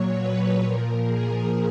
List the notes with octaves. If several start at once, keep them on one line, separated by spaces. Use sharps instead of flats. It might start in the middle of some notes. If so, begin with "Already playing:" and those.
Already playing: A#2 F#3 C#5
B4
A#2 F3 A#4
G#4